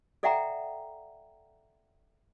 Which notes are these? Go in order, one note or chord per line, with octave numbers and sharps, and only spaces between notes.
A4 D5 E5 F#5 G5 A#5